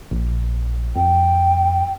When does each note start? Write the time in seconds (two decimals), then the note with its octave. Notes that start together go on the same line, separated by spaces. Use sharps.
0.11 A#1
0.96 F2 G5